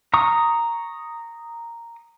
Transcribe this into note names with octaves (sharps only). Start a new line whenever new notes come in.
A#5 C#6 D#6